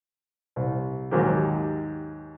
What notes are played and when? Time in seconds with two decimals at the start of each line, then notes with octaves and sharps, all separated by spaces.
0.56 C2
1.11 D#2 G#2 F#3 A#3 G4